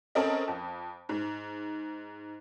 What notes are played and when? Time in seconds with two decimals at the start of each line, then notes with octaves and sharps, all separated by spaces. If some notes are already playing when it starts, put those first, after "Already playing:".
0.15 C4 C#4 A4 A#4 D#5
0.48 F2
1.09 G#2